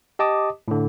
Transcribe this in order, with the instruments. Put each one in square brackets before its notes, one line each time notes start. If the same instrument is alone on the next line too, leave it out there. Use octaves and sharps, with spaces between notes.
[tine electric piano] G4 D#5 A5 D6 D#6
A2 D3